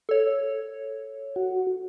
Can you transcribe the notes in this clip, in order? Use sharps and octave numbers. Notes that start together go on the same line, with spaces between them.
A4 C#5
F#4